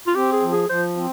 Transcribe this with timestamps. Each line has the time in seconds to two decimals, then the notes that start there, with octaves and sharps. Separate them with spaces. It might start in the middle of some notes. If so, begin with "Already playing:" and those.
0.07 F4
0.15 C4 G4
0.32 G#4
0.42 F3
0.52 G#4
0.69 F3 C5
0.96 C4